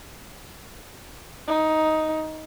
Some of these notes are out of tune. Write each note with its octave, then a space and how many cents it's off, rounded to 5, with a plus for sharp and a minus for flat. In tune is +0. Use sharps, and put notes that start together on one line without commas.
D#4 +10